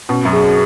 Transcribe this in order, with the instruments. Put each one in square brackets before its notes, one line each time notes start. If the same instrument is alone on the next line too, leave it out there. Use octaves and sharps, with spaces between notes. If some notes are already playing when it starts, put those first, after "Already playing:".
[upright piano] B2 [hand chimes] C#4
[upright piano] F#2
[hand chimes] G#4